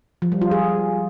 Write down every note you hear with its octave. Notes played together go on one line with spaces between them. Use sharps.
F3
G3
F4
G#4